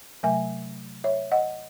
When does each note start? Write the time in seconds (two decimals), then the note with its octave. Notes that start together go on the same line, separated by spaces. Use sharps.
0.23 C3 F#3 A3 E5 G#5
1.04 C#5 E5
1.32 D#5 F#5